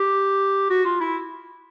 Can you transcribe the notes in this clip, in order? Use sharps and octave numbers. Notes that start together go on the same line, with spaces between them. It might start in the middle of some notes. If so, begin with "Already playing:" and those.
Already playing: G4
F#4
F4
E4